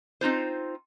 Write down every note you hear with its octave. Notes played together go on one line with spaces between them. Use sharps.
C4 D#4 F4 C5